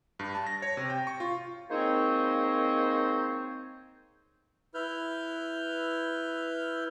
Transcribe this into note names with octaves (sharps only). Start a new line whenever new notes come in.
G2
A5
A#6
C#5
C3
G5
C#6
F4
G#3 A#3 C4 D#4 C5 C#5
E4 B4 F6 G6